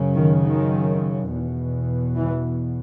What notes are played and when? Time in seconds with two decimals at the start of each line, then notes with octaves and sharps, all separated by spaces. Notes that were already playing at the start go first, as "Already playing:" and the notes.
Already playing: F#2 C#3
0.15 D#3
0.43 D#3
1.30 E2 B2
2.16 E3